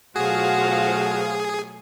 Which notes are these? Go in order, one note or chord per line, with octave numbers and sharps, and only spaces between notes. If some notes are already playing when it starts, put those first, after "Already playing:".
B2 F#3 A3 F4 F#4 G#4 C5 F5